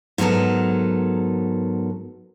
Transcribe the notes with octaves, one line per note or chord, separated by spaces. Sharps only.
G#2 F#3 B3 A4 A#4